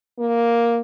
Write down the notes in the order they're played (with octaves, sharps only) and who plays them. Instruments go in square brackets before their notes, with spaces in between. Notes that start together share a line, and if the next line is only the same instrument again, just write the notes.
[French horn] A#3